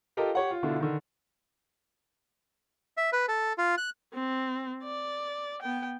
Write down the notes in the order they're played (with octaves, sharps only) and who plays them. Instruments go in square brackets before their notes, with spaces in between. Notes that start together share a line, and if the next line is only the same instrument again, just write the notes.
[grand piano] F4 G4 A4 A#4 D#5
G4 C#5 F#5
F4
B2 D3 D4 E4 F4
D3 D#3
[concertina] E5
B4
A4
F4
F#6
[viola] C4
D5
B3 G5